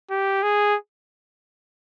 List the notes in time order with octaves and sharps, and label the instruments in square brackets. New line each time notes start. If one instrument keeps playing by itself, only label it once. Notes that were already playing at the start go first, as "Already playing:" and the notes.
[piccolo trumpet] G4
G#4